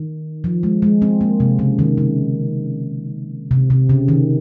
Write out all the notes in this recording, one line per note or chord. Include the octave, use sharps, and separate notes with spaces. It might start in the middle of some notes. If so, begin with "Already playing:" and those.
Already playing: D#3
F3
G#3
G#3
C4
A#3
C3
C#3
D#3
C#3
C3
C3
C#3
D#3